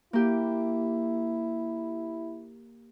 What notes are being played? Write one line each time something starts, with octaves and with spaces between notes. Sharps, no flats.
A#3 E4 G4